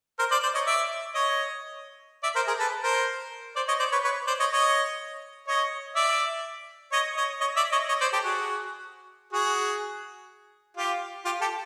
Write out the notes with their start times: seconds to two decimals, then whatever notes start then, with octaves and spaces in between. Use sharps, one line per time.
0.19 A#4 C5
0.31 C5 D5
0.43 C5 D5
0.55 C#5 D#5
0.67 D5 E5
1.15 C#5 D#5
2.23 D5 E5
2.36 A#4 C5
2.47 G#4 A#4
2.59 A4 B4
2.83 A#4 C5
3.56 C5 D5
3.68 C#5 D#5
3.79 C5 D5
3.92 B4 C#5
4.04 B4 C#5
4.27 C5 D5
4.39 C#5 D#5
4.52 C#5 D#5
5.48 C#5 D#5
5.96 D5 E5
6.92 C#5 D#5
7.17 C#5 D#5
7.41 C#5 D#5
7.56 D5 E5
7.72 C#5 D#5
7.89 C#5 D#5
8.01 C5 D5
8.13 G4 A4
8.24 F#4 G#4
9.32 F#4 G#4
10.77 F4 G4
11.25 F4 G4
11.41 G4 A4